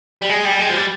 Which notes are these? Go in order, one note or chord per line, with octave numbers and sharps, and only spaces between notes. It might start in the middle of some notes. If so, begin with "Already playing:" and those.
G3
G#3
G3
G#3
F3
G3